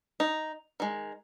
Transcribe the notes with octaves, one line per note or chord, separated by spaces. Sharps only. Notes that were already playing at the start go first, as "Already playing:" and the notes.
D#4
D#3 G#3